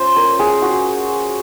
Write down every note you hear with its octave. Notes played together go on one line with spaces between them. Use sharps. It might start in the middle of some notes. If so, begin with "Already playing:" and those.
Already playing: C#4 F4 C5
A#4
G#4
F#4